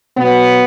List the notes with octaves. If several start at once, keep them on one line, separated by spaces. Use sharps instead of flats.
B2 F#3 B3